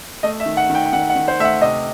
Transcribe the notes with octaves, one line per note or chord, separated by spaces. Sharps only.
A3 D#5
E5
D#3
F#5
D#3
G5
G5
D#3 F#5
F#5
D#3
C5
A3 E5
F#5
C3 D#5